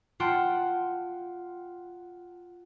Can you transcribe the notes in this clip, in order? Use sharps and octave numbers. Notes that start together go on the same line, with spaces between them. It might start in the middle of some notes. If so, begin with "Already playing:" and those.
F4 F#5 G5 A5 C6